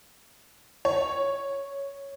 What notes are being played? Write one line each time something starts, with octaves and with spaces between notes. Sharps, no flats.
C#5